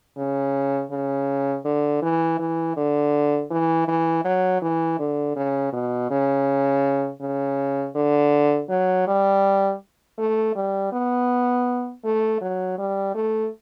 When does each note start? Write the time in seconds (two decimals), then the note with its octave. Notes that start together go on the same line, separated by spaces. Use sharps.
0.17 C#3
0.91 C#3
1.65 D3
2.02 E3
2.39 E3
2.77 D3
3.51 E3
3.88 E3
4.24 F#3
4.62 E3
4.99 D3
5.36 C#3
5.73 B2
6.10 C#3
7.21 C#3
7.95 D3
8.70 F#3
9.07 G3
10.18 A3
10.55 G3
10.93 B3
12.04 A3
12.41 F#3
12.78 G3
13.15 A3